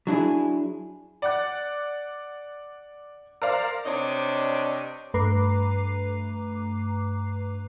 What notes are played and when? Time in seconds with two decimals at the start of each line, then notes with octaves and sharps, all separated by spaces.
0.07 F#3 D4 E4 G#4
1.22 D5 F#5 F#6
3.42 A#4 C5 D5 F5
3.85 C3 D4 C#5 D#5
5.14 G2 A3 B4 A#5 D6 C7